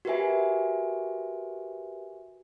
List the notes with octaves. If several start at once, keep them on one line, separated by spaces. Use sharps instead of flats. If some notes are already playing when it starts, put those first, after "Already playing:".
F#4 G4 A#4 B4 E5 G#5